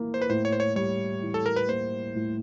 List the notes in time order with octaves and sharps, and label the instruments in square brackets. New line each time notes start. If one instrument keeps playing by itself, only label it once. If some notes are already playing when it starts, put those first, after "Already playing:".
Already playing: [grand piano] E3 A#3
[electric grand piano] C5
B4
[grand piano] A2 [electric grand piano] C5
[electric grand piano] C#5
C5
C#5
[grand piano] G3 [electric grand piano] C#5
[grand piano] E3
[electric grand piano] A4
A#4
B4
[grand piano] A#3 [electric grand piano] C5
[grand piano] A2